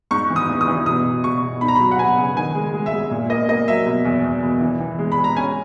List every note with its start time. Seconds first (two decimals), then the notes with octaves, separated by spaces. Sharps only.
0.11 G#2 C#6
0.30 E3
0.36 D#6
0.49 E3
0.61 D#6
0.68 E3
0.86 B2 D#6
1.05 B2
1.24 B2 C#6
1.42 B2
1.61 D#4 B5
1.68 A#5
1.75 B5
1.80 F#3
1.91 F#5
1.98 B3 G#5
2.17 C#3
2.36 D#3 G#5
2.55 G#3
2.74 G#3
2.86 E5
2.93 G#3
3.11 A#2
3.29 A#3 D#5
3.49 A#3 D#5
3.67 F#3 E5
3.86 B2
4.05 E2
4.24 E2
4.43 B2
4.61 E3
4.80 E3
4.99 G#3
5.12 B5
5.17 G#3
5.24 A#5
5.36 C#4 G#5